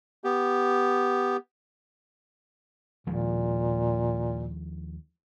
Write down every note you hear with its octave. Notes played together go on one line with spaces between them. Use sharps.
B3 G4
D#2 A#2 F3 G#3